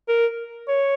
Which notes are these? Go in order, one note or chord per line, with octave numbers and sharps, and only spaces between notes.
A#4
C#5